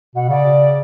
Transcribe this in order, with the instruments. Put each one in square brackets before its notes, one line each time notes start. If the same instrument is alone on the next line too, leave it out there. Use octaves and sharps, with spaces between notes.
[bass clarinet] B2 [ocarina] F#5
[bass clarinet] C#3 [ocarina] D5